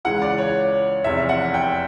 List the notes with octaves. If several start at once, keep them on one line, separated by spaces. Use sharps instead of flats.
C#2 C#3 E3 F#5
D5
C#5
F1 E2 C3 E3 E5
F#5
G5